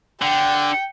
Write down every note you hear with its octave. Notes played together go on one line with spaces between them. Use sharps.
D3 G5